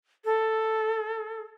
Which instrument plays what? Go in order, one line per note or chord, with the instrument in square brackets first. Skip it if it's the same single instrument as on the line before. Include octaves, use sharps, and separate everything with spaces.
[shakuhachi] A4